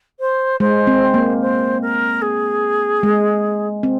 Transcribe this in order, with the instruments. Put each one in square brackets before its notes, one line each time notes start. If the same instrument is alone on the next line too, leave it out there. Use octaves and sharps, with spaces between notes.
[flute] C5
[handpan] G#3 [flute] C5
[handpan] C4
A#3
[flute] C5
A#4
G#4
[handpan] G#3
C4